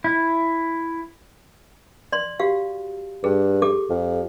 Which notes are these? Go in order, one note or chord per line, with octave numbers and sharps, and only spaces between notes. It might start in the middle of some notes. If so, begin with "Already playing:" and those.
E4
D5 C6
F#4 G4 F5
G2 G#4
G4 A4 D6
F2